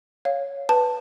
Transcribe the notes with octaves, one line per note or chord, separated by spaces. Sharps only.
C#5 F5
B4 A5